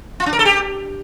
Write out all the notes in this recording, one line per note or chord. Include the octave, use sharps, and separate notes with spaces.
F4
D4
A#4
A4
G4